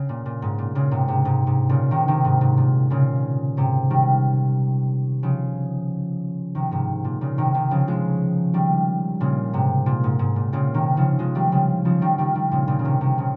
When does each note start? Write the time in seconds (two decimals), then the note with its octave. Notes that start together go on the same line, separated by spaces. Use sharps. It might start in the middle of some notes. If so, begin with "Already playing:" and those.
Already playing: C#3
0.09 A#2
0.26 A#2
0.42 G#2
0.59 A#2
0.75 A#2 C#3
0.91 G#2 C3
1.08 G#2 C3
1.25 G#2 C3
1.47 G#2 C3
1.69 A#2 C#3
1.91 C3 D#3
2.08 C3 D#3
2.25 G#2
2.41 G#2
2.57 A#2
2.90 A#2 C#3
3.57 G#2 C3
3.91 D#3 G3
5.23 C#3 F3
6.55 C3 D#3
6.71 G#2 C3
7.04 A#2
7.21 A#2 C#3
7.38 C3 D#3
7.54 C3 D#3
7.71 C#3 F3
7.87 F3 G#3
8.54 D#3 G3
9.21 A#2 C#3
9.53 G#2 C3
9.86 A#2
10.04 G#2
10.19 G#2
10.36 A#2
10.53 A#2 C#3
10.74 C3 D#3
10.97 C#3 F3
11.19 F3 G#3
11.35 D#3 G3
11.52 C#3 F3
11.85 C#3 F3
12.01 D#3 G3
12.18 D#3 G3
12.35 D#3 G3
12.51 A#2 C#3
12.68 A#2 C#3
12.79 C#3
12.85 C3 D#3
13.01 C3 D#3
13.18 A#2 C#3